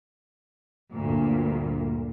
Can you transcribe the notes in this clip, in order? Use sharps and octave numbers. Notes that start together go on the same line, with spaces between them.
D2 G2 A#2